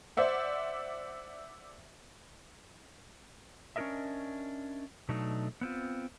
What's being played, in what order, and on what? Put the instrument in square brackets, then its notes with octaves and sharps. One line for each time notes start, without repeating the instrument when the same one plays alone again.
[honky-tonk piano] C5 D5 E5 F#5
[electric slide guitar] C#4 D4 E4 A#4 D#5 E5
B2 F#3 A3 D4 D#4
B3 C4 F4